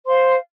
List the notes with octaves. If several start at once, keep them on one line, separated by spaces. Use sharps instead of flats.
C5 F5 C6